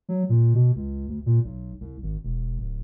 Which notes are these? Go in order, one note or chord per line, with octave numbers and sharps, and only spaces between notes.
F#3
A#2
B2
C#2
D2
A#2
B1
C2
G#1
E1
D1